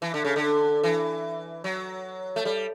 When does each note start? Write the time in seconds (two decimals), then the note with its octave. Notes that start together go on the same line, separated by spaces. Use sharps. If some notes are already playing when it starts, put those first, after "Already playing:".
0.02 E3
0.14 D3
0.25 C#3
0.36 D3
0.84 E3
1.64 F#3
2.36 A3
2.45 G3